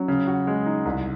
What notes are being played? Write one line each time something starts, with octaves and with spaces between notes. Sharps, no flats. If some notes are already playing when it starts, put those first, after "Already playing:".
Already playing: F#3 C#4
C#3
F#4
G#3
D#4
C2